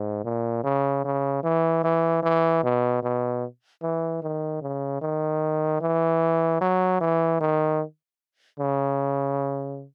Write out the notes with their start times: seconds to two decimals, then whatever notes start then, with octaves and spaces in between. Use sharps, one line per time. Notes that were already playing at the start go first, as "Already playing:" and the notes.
Already playing: G#2
0.25 A#2
0.64 C#3
1.05 C#3
1.43 E3
1.84 E3
2.23 E3
2.64 B2
3.03 B2
3.83 E3
4.23 D#3
4.62 C#3
5.01 D#3
5.81 E3
6.61 F#3
7.01 E3
7.41 D#3
8.60 C#3